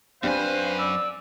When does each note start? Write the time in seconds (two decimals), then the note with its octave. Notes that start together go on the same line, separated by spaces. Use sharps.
0.23 F#2 C4 D4 G4 B4 C5 F5 G#5
0.79 D5 E6